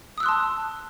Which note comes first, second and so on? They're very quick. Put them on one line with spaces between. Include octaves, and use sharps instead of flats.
D#6 E6 F#6 C6 A5